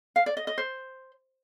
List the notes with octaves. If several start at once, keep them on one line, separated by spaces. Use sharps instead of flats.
F5
D5
D#5
D#5
C5